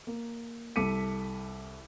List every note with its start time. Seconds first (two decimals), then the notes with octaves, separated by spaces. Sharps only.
0.07 A#3
0.76 C2 A4 D6 B6 C#7 D#7